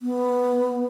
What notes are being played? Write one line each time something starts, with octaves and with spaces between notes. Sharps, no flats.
B3